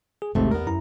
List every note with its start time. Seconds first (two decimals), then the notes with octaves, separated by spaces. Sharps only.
0.22 G#4
0.35 A1 D#2 G#2 C3 A3 C4
0.51 E2 B3 A#4
0.67 F#2 E4 A#5